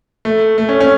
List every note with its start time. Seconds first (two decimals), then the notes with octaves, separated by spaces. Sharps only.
0.25 A3
0.58 A3
0.69 C#4
0.81 C#4